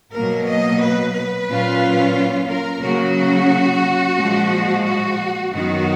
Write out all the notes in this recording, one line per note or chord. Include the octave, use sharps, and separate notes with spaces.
B2 F#3 A#3 A#4
D#5
B4
B4
A#2 F#3 C#4 F4
A#4
C#3 F#3 A#3 F#4
A#2 F3 G#3
F#4
F#2 D#3 F#3 B3 F#4